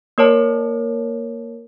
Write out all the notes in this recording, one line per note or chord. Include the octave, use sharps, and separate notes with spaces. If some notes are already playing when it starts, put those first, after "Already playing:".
A#3 A#4 C#5 A5